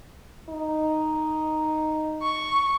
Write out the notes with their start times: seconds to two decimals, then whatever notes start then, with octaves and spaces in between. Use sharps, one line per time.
0.49 D#4
2.22 C#6